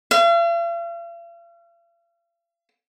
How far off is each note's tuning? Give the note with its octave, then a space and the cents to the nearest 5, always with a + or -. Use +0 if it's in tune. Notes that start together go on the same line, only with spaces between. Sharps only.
F5 -45